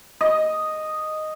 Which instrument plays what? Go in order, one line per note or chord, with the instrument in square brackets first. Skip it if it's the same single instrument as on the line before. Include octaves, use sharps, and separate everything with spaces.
[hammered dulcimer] D#5